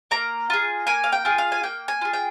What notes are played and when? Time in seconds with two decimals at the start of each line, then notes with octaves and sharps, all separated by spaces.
0.11 A#3 A#5
0.50 F4 G#4
0.87 A#3 G#5
1.04 F5
1.12 G5
1.25 F4 G#4
1.38 F5
1.52 G#5
1.63 A#3 G5
1.88 G#5
2.01 F4 G#4
2.13 G5